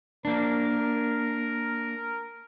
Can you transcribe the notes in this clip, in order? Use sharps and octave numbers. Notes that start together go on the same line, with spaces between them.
A#3 D4 A#4